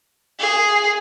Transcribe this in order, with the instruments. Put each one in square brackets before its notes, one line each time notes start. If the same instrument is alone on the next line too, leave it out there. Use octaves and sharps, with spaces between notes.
[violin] G#4